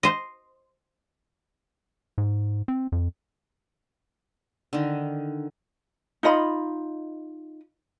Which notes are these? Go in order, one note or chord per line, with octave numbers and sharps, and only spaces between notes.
C5 D#5
G#2
C4
F2
D3 D#3
D#4 F4 D#5 B5